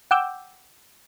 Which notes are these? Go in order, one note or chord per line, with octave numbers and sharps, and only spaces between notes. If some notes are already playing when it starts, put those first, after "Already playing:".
F#5 G5 D6 E6 G6